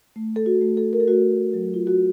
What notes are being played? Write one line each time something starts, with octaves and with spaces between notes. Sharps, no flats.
A3
A4
F#4
A3
A4
A#4
A4
A3 F#4
F#3
F4
F#4